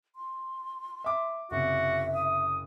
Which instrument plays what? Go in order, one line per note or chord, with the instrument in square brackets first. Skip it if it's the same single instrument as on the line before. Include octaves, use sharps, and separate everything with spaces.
[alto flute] C6
[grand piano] E5 D6
[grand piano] F#1 C3 [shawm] F#4 [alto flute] E5
[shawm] D#6